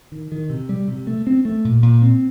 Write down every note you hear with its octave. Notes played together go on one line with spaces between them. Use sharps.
D#3
D#3
C3
G3
C3
A3
C4
A3
A#2
A#2
C4